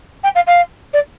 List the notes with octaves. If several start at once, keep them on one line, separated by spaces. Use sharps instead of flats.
G5
F5
F5
D5